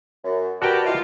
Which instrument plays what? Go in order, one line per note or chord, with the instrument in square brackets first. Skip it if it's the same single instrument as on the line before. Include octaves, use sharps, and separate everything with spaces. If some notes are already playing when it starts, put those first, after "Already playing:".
[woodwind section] F#2
[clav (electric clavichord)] F#4 A#4 G5 [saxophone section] G4 [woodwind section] B4 D5 A5
[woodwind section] C2 E3 D#4 [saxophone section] F4